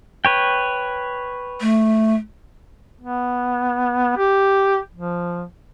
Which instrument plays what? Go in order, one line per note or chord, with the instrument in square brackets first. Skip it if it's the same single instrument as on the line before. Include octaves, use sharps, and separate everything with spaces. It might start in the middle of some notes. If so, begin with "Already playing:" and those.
[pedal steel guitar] B4 C#5 G5
[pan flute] A3
[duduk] B3
G4
F3